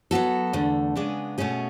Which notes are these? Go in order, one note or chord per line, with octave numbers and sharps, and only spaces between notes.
F#3 B3 F#4 A4
E2 D3 A3
C#3 G#3 B3 D4 G#4
B2 A3 C#4 G#4